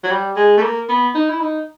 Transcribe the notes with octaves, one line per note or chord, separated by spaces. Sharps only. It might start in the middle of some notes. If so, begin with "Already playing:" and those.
F#3
G3
G#3
A3
A#3
B3
D#4
E4
D#4